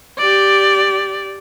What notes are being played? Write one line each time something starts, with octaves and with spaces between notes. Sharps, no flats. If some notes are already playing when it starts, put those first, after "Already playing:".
G4 D5